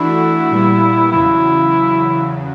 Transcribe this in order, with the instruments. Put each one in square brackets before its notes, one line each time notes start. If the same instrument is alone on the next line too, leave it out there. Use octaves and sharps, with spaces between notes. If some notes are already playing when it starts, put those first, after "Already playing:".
Already playing: [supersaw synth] E3 A3 D4 F#4 [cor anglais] E4
[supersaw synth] A#2 G3 B3
[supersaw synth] E2 C#3 F#3 [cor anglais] E4